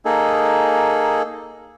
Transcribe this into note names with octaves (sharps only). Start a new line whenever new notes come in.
A#3 D#4 G#4 A4